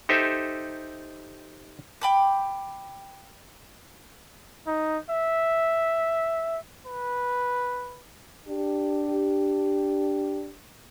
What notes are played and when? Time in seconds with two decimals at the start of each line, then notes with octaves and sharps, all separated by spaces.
0.09 D#4 G4 A4 C5 E5
2.02 G5 B5 D6
4.67 D#4
5.10 E5
6.86 B4
8.46 D4 G4